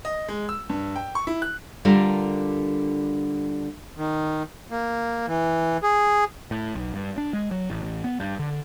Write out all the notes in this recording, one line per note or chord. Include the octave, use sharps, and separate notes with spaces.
D#5
G#3
E6
G2
G5
C#6
E4
F#6
D3 G3 D4 F4 A4 A#4
D#3
A#3
E3
G#4
A2
B1
G2
D4
G#3
F#3
A1
A1
B3
G2
D3